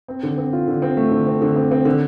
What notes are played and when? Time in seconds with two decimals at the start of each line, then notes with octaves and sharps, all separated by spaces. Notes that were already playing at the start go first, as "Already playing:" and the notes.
0.08 C4
0.23 D3
0.38 C4
0.53 F4
0.68 D3
0.82 C4
0.97 A3
1.12 D3
1.27 C4
1.42 D3
1.56 C4
1.71 C4
1.85 D3